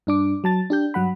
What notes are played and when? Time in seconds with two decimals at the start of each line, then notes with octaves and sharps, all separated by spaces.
0.07 G2 D4 D6
0.44 F#3 A5 A6
0.70 D4 G4 G6
0.94 G2 F#3 F#5 B5